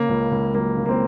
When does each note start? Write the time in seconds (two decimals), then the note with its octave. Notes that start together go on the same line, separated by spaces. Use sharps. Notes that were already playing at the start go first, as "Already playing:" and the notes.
Already playing: C#3 A#3
0.09 C#2
0.31 C#2
0.54 F#3 A#3
0.77 C#3
0.86 A#3
0.89 C4